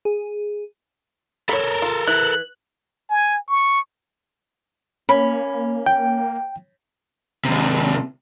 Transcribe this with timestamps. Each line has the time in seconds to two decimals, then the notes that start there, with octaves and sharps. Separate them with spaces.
0.05 G#4
1.49 A4 A#4 C#5 B5
1.82 F4
2.07 E3 F#6
3.10 G#5
3.48 C#6
5.09 A#3 C#4 B5
5.86 G5
7.45 D#2 C3